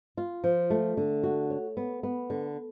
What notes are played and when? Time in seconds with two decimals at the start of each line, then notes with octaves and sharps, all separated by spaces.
0.18 F4
0.44 F3
0.70 A3
0.97 D3
1.23 F#4
1.50 C#5
1.77 B3
2.03 B3
2.30 D3